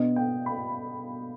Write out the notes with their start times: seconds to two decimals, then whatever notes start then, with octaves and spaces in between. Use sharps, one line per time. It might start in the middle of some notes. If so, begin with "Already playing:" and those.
Already playing: B2 B3 D4 D#5
0.16 G5
0.46 B5